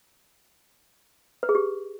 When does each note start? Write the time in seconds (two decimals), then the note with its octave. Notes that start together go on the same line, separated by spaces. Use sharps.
1.43 B4
1.49 G#4
1.55 G4